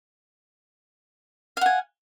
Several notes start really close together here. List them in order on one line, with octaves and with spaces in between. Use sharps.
F5 F#5 G#5